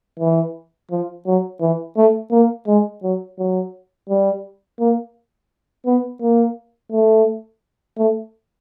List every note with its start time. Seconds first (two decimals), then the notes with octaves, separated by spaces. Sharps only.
0.20 E3
0.91 F3
1.26 F#3
1.61 E3
1.97 A3
2.31 A#3
2.67 G#3
3.03 F#3
3.39 F#3
4.09 G3
4.80 A#3
5.86 B3
6.21 A#3
6.92 A3
7.98 A3